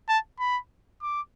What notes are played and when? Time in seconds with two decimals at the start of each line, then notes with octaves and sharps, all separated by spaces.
0.08 A5
0.39 B5
1.02 D6